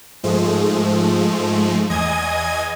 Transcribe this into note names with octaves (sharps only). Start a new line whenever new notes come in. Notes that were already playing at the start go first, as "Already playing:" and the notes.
G#2 F3 G#3 A3
E2 D#5 G#5 D#6 G#6